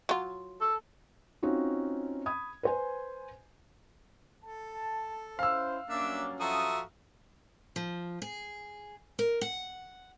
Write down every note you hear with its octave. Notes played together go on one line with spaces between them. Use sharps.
F#3 F4
A4
C4 C#4 D#4 F4 F#4
B5 D#6 G#6
B4 C5 G#5
A4 A5
C#4 E4 C5 F5 E6
G2 F#3 A#3 C#4 D4 E5
F3 F#4 A4 E5 A#5 D#6
F3
G#4
A#4
F#5